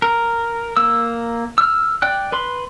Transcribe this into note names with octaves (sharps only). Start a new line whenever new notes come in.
A#4
A#3 E6
E6 F6
D5 G5 F#6
B4 B5 C6